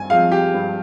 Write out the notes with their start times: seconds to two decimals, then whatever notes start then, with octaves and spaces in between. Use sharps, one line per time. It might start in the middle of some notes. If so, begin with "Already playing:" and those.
Already playing: G2 G#5
0.10 F3 G#3 C4 F5
0.32 G4
0.54 G2